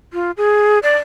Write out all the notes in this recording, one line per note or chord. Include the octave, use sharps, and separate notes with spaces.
F4
G#4
D5